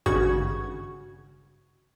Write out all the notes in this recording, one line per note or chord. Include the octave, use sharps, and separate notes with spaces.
G#1 G2 C#3 F#4 C#6 G#6